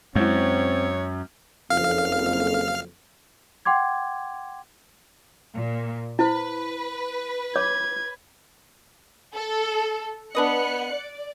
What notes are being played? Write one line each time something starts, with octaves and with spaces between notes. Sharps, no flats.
F#2 G#3 C4 E4 C#5
F#1 F2 F5 F6
F#5 G5 C6 D6 G#6
A#2
E4 B4 C5
C#5 D6 G#6
A4
B3 D4 B4 D#5 F#6 C#7
D5